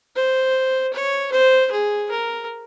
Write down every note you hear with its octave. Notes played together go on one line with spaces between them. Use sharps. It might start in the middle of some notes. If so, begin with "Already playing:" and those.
C5
C#5
C5
G#4
A#4